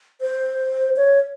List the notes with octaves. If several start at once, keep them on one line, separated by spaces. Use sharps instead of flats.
C5
C#5